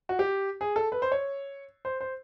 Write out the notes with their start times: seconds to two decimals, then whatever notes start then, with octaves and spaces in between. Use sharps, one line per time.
0.09 F#4
0.19 G4
0.61 G#4
0.76 A4
0.92 B4
1.02 C5
1.12 C#5
1.85 C5
2.01 C5